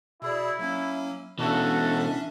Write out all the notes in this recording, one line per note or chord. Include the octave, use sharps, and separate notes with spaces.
B2 E4 G#4 D5
F#3 A#3 C#4
B2 E3 A3 C#4 D4 F#4 A4 E5